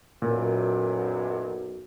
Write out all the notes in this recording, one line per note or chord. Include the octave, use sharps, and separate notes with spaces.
B1 F#2 A#2